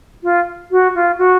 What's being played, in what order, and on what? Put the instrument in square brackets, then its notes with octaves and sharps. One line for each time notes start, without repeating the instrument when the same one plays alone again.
[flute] F4
F#4
F4
F#4